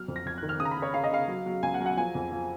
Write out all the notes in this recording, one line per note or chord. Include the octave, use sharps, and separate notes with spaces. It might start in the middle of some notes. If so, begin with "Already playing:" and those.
Already playing: F#3 F6
F2
A#6
F2 G#6
F#6
D#3
F6
C#3 D#6
A#5
B5
C#3
C#5
C#3 F5
D#5
C#3 F5
F#3
F#3
C#2 G#5
F#5
F#3
F#5
F3 G#5
F2
F3